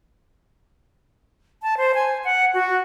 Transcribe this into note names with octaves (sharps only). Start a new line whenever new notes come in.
A5
C5
G#5
F#5
F#4